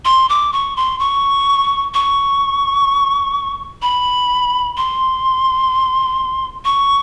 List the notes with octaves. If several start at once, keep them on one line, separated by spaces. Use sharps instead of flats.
C6
D6
C#6
C6
C#6
C#6
B5
C6
C#6